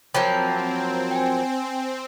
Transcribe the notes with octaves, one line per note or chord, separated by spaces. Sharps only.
F3 F#3 A#3 C4 G5 B5
G5 G#5